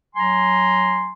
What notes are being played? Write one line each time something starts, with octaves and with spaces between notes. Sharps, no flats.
F#3 G#5 A#5 C6